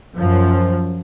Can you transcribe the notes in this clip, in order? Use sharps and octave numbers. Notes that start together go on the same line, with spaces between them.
F#2 F3